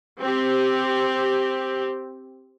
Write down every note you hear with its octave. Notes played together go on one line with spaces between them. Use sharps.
C4 G4